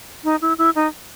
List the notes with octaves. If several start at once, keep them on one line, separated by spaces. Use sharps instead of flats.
D#4
E4
E4
D#4